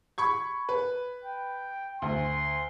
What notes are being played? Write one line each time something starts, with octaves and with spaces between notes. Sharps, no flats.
B5 C#6 G#6
B4
G5
D2 C6